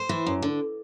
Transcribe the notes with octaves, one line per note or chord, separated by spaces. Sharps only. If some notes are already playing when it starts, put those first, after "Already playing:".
Already playing: C5
E3
F#2
D3